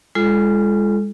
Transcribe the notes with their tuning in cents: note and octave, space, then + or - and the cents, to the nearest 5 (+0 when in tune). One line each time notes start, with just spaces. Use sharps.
G#3 -25 F4 -20 A4 -25